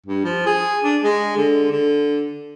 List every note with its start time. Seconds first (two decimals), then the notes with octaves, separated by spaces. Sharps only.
0.06 G2
0.25 F3
0.46 G#4
0.84 D4
1.04 G#3
1.37 D3
1.71 D3